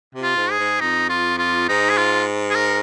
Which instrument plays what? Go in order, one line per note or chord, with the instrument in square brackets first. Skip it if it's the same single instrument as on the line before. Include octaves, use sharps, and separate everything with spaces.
[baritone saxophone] C3
[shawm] F4
[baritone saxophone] G#2
[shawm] G#4
[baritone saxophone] G#2
[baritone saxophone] F2 [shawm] D#4
[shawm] F4
F4
[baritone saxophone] G#2 [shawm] D#4
[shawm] G#4
F4
G#4
A#4